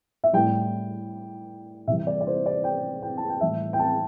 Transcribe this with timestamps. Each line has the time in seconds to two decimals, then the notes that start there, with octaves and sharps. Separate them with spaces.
0.24 E5
0.33 A2 G3 G5
1.87 C3 E5
1.90 E3 G3
2.07 D5
2.21 D5
2.27 C5
2.46 D5
2.64 G5
3.02 G5
3.18 A5
3.29 G5
3.41 A2 E3 G3 E5
3.73 G5
3.79 A5